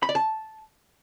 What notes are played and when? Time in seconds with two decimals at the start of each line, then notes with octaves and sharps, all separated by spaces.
0.03 B5
0.09 D5
0.15 A5